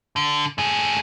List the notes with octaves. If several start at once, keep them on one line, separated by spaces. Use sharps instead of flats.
D3
A2 G#4